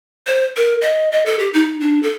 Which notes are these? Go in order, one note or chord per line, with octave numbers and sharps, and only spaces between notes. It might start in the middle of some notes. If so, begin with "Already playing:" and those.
C5
A#4
D#5
D#5
A4
G4
D#4
D4
A4